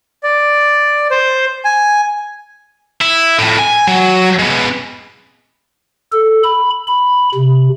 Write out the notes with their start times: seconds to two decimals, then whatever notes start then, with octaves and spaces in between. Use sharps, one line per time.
0.23 D5
1.11 C5
1.65 G#5
3.01 E4
3.39 F2 A2
3.59 G#5
3.87 F#3
4.39 G#3 B3
6.12 A4
6.44 B5
6.87 B5
7.34 C3